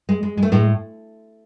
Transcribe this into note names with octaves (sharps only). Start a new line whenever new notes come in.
G#3
G#3
G#3
A3
A2 G#3